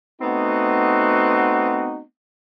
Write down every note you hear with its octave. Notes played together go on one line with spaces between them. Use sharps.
A3 B3 C4 D#4 F#4